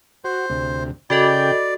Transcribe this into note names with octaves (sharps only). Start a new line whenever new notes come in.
F#4 C5
D2 C3
C#3 F#4 A4 D5 D#5 G5